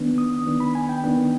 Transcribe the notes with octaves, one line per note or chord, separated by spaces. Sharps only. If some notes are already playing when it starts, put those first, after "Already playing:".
Already playing: D#3 B3 D4
D#6
D#3 B3 D4
B5
G#5
G5
D#3 B3 D4